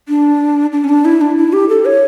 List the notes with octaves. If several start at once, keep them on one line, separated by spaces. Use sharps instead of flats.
D4
D4
C#4
D4
E4
D4
E4
G4
A4
C#5